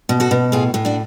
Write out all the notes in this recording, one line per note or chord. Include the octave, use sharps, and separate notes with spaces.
B2
F#4 A4
B2
A2 F4 G#4
A2
D4 F#4